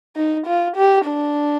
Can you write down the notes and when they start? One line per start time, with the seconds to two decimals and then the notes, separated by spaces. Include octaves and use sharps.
0.16 D#4
0.46 F4
0.76 G4
1.07 D4